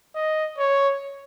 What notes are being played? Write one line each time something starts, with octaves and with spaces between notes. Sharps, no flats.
D#5
C#5